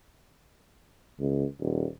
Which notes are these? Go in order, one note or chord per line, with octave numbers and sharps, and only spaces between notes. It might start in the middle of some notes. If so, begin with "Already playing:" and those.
C#2
D#1